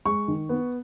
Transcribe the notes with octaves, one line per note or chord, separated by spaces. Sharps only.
G#3 C#6
D#3
B3